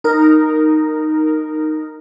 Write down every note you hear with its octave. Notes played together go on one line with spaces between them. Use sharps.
D#4 A#4